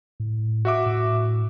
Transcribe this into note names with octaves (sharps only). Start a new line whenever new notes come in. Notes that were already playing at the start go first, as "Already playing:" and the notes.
A2
F#4 E5 D6
A2